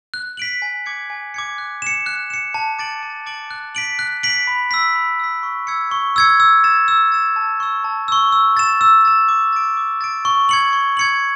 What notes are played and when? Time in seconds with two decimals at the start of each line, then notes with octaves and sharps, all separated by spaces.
0.14 F#6
0.37 B6 D7 F#7
0.62 G#5
0.86 D6 G#6 C#7
1.10 G#5
1.34 D6 G#6 C#7
1.58 F#6
1.82 C#7 E7
2.06 F#6
2.30 C#7 E7
2.54 A5
2.79 D6 A6 D7 F#7
3.03 A5
3.26 D6 A6 D7 F#7
3.51 F#6
3.75 B6 D7 F#7
3.99 F#6
4.23 B6 D7 F#7
4.47 B5
4.71 E6 B6
4.95 B5
5.20 E6 B6
5.43 C#6
5.67 E6 G#6 C#7
5.91 C#6
6.16 E6 G#6 C#7
6.40 E6
6.64 A6 E7
6.88 E6
7.12 A6 E7
7.36 A5
7.60 C#6 E6
7.84 A5
8.08 C#6 E6
8.32 E6
8.57 A6 E7
8.81 E6
9.05 A6 E7
9.29 D6
9.53 A6 D7
9.77 D6
10.01 A6 D7
10.25 C#6
10.49 G#6 C#7 F#7
10.73 C#6
10.97 G#6 C#7 F#7